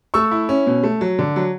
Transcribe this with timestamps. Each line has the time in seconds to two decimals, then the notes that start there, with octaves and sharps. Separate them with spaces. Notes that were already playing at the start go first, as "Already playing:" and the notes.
0.14 A3 C#6 E6
0.31 E4
0.49 C#4
0.67 B2
0.84 A3
1.01 F#3
1.19 D3
1.36 F#3